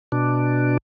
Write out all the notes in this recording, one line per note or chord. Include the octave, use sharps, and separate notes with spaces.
B2 D4